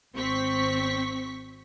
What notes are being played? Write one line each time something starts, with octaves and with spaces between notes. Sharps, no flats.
G#1 C4 C#6 B6